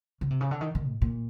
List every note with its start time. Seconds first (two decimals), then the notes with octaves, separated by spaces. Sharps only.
0.21 C#3
0.30 C3
0.41 C#3
0.51 D3
0.61 D#3
0.75 D#3
0.87 A2
1.02 A#2